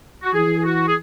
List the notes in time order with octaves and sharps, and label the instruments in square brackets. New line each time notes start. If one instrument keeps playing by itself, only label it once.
[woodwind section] F#4
[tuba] E3 [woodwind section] G#4
[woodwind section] G#4
F#4
G#4